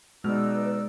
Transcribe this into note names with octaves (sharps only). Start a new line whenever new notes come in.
B2 G#3 D#4 B4 D5 E6 F6